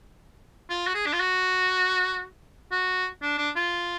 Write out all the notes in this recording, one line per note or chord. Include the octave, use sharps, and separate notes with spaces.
F4
F#4
G#4
D4
F4
F#4
F#4
D4
D4
F4